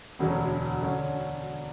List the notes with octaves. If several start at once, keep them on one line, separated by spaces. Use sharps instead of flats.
E1 D2 D3 F#3 C#4
D3 F#3 C#4